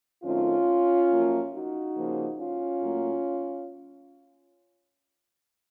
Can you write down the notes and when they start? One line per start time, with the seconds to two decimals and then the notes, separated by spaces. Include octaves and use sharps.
0.25 F#2 D#3 A3 C4 C#4 F4
1.11 F#2 F3 A#3
1.53 D#4 F#4
1.96 C#3 F3 A#3
2.39 C#4 F4
2.82 A2 F#3 A#3